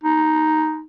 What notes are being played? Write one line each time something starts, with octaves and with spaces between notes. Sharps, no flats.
D#4